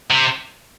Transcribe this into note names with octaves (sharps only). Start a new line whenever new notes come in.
C3